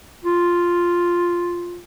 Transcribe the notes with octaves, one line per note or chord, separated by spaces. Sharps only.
F4